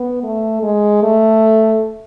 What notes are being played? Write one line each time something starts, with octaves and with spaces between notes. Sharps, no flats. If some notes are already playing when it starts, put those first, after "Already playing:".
Already playing: B3
A3
G#3
A3